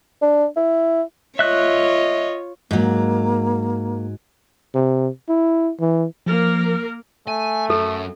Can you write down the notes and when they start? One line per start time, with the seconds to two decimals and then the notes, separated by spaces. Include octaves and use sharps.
0.22 D4
0.56 E4
1.39 F4 C#5 D#5 E5 F#6
2.71 G#2 F#3 A#3
4.75 C3
5.29 E4
5.80 E3
6.26 F3 A#3 A#4
7.27 A3 G#5
7.70 F#2 A4